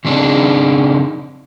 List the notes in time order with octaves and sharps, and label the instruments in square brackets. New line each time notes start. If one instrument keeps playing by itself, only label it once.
[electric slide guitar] C#3 C4 D4 D#4 G#4